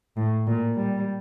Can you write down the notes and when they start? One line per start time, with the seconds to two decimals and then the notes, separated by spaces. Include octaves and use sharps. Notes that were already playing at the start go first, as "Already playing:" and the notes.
0.17 A2
0.47 A#2
0.76 G3